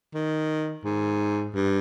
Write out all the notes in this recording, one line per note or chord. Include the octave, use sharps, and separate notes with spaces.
D#3
G#2
G2